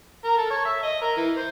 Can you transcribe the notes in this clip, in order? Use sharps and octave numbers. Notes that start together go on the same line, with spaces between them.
A#4
A4
C#5
E5
D#5
A#4
E3
C5